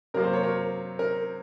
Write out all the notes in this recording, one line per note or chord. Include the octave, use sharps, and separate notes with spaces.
C3 F#3 A#3 A#4
C5
C#5
A#4
A#4